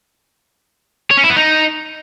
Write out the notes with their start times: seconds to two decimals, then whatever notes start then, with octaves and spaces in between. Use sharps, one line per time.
1.11 C#5
1.17 C#4
1.24 E4
1.30 B3
1.36 D#4